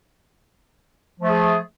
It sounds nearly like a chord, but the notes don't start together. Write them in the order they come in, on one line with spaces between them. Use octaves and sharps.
F3 A3 G#4